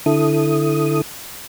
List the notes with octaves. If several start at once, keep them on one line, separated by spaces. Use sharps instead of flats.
D3 E4 A4 D#6